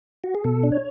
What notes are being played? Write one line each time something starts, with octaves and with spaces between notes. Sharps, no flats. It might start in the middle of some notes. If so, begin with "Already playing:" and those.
F#4
G#4
B2 A4
D4
C#5